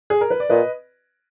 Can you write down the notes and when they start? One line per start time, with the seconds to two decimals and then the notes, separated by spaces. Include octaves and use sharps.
0.10 G#4
0.21 A#4
0.30 B4
0.40 D5
0.50 A#2 B4 D#5